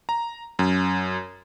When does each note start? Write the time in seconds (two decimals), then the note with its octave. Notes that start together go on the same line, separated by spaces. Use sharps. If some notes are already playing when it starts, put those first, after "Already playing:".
0.09 A#5
0.59 F#2